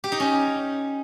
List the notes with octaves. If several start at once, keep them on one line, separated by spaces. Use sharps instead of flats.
G4
D#4
C#4